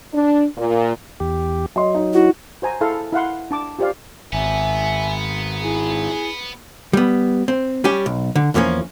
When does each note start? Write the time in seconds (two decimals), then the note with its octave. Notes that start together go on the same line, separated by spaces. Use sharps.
0.14 D4
0.58 A#2
1.20 E2 G4
1.76 F#3 D#5 C6
1.95 D#4
2.13 E4 F#4
2.62 F#4 C5 G#5 A#5
2.81 E4 G#4 A4 F5 C6
3.12 E4 F5 F#5 C6
3.51 D4 A5 D6
3.79 F4 G4 C5 D5 F5
4.33 G#1 B3 E5 G#5
5.63 E4 G#4
6.93 G3 B3
7.48 C4
7.84 G3 C#4 G4
8.06 B1
8.35 D3
8.54 E2 E3 F3 A#3 C#4